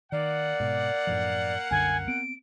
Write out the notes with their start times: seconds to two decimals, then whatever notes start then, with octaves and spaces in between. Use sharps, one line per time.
0.12 D#3 A#3 D5 F#5
0.60 G#2 B2
1.07 F#2 A2 F3
1.71 C2 F#2 D3 G#5
2.08 B3 C4 D7